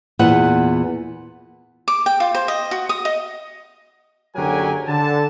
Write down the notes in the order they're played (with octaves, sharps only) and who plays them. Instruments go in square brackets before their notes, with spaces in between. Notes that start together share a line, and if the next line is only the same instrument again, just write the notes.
[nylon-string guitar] E2 A#2 B3 F#5
[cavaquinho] D6
G5
F4
C5
D#5
F#4
D#6
D#5
[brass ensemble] F#1 D3 F#3 G4 A#4 G#5
D3 A5